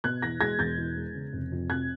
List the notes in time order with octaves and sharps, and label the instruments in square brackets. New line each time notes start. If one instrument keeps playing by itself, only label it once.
[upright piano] B2 F#6 G#6
E2 G#6 A#6
G#3 G#6 A#6
E1 G6 A6
E2
G#3
C#3
F1
F2
F1 F#6 G#6